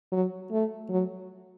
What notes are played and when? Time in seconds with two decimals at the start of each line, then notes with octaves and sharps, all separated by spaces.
0.12 F#3
0.52 A3
0.89 F#3